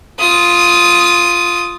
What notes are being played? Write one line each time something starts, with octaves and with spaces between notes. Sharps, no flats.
F4 D#6